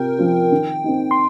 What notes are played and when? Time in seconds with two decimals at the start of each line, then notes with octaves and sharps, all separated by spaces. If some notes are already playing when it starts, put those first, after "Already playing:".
Already playing: C3 F4 A#4 G5
0.18 F3 C4 F4
0.52 D#3
0.84 C4 D#4
1.11 C6